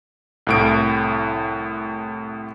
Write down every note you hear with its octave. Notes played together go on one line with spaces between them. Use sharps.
C2 A2 D7